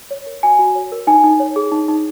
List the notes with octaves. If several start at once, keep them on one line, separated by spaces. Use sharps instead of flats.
C#5
A#4
F#4 G#5
F#4
C#5
A#4
D#4 G#5
D#4
C#5
G#4
D#4
D#4